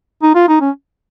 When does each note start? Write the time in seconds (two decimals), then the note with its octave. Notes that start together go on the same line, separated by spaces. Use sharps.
0.23 D#4
0.35 F4
0.48 D#4
0.61 C#4